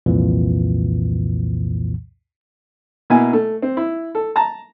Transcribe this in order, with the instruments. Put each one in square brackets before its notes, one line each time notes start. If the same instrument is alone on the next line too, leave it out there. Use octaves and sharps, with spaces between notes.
[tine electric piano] C2 F2 A#2 E3
[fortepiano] B2 A#3 B3 E4 G#5
A3
C4
E4
A4
A5 A#5